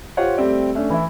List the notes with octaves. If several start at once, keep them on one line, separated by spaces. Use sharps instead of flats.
F4 G4 C5 C#5 F#5
G3 A3 C4 G4 D5
A3 C#4 D4
E3 E4